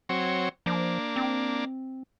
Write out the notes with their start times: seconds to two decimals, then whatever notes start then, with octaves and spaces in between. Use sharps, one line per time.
0.09 F#3 C4 C#5
0.66 F3 A#3 D4
1.16 C4